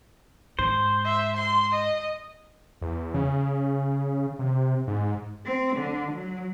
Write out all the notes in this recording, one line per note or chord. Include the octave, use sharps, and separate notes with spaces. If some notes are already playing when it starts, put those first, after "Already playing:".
G#2 C5
E5
C6
D#5
E2
C#3
C3
G#2
C4
D3
F#3